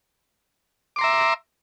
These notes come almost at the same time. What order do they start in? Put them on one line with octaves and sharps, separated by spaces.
D6 C6 A#5 E5